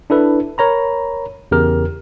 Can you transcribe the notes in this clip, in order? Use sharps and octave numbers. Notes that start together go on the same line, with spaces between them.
D4 E4 A4 B4
A#4 C#5 A#5 B5
E2 C#3 G4 A#4 F6